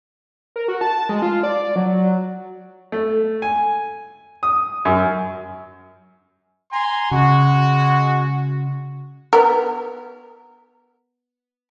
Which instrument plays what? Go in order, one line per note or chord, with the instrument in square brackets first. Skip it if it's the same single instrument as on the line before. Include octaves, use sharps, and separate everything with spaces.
[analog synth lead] A#4
F#4
A5
G#3
F4
D5
F#3
[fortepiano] A3
G#5
D#6
F#2
[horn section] G#5 A#5 C6
[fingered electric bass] C#3 [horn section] G#3 F#4
[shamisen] B3 A#4